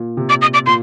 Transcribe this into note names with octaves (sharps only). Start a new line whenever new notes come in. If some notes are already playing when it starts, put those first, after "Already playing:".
Already playing: A#2
C3
D6
D#6
D6
A#2 C6